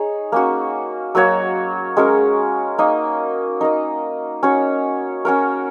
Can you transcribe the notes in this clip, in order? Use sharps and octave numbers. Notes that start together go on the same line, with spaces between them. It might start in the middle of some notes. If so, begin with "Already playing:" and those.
Already playing: D#4 G#4 C#5
A#3 C#4 F#4
F#3 A#3 F#4 C#5
G#3 C#4 F#4 A#4
A#3 D#4 A#4 D#5
D#4 A#4 D#5
C#4 F#4 C#5
C#4 F#4 A#4